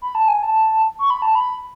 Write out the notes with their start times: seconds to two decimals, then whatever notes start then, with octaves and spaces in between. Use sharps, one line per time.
0.02 B5
0.15 A5
0.28 G#5
0.43 A5
0.99 C#6
1.10 B5
1.22 A5
1.35 B5